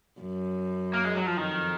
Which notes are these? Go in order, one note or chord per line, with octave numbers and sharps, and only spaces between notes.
F#2
A#3
G#3
F#3
F3
F2 D#3